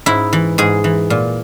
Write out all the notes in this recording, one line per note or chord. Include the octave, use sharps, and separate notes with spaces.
G#2 E4
E3
G#2 G#4
E3
A#2